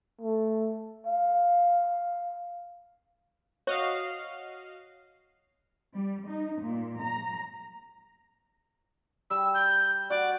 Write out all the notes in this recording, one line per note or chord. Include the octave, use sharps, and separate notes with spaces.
A3
F5
F#4 C#5 D#5 F5
G3
D#4
A#2
A#5
G3 E6
G6
F#4 D5